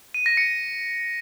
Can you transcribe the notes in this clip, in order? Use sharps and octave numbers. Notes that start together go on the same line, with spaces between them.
D#7
A#6
C#7